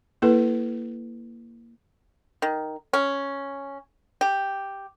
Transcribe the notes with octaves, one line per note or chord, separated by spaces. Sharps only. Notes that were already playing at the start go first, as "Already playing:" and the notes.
A#3 E4 A4 B4
D#3
C#4
G4